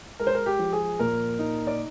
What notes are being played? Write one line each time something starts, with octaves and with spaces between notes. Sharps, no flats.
G#3 A#4
C5
A#4
G4
F3
G#4
A#2 A#4
D#4
D5